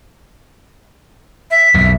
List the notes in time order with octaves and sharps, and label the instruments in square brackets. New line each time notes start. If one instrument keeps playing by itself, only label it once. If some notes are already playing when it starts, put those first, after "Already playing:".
[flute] E5
[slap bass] B1 F2